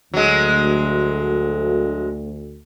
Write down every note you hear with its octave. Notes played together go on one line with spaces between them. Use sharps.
D2 F#3 G#3